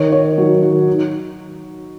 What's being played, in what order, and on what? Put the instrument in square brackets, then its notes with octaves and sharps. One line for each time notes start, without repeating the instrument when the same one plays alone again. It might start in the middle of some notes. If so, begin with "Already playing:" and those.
Already playing: [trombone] D#3 [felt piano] C#5
[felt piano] C#5
F#3
F#4
D#4